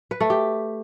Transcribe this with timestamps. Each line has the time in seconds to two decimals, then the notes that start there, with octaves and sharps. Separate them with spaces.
0.11 B4
0.20 A3
0.30 G4